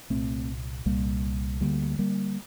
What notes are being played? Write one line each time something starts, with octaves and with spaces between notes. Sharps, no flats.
C2 A#2 A3 C4
C2 A#2 G3 A#3
D2 D3 G3 A#3
G3 A#3